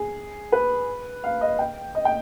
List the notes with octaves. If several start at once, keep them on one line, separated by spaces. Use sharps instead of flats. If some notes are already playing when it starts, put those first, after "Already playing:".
Already playing: G#4
B4
F5
D#5
G5
D#5
G5